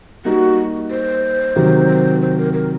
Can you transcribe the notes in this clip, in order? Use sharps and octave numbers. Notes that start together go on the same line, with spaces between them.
G3 A#3 D#4 F#4
C5
C3 D#3 F#3
C5
A#4
A#4